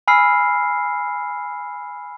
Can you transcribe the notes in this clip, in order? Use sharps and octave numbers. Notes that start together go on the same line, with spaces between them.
G#5 B5 E6 F6 C7